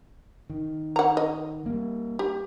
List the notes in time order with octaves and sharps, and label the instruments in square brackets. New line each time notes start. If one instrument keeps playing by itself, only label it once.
[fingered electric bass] D#3
[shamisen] F#5 A#5
D#5
[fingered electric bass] G3 A#3
[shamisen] G4